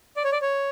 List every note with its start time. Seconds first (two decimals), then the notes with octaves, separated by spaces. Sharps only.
0.17 D5
0.24 C#5
0.32 D5
0.42 C#5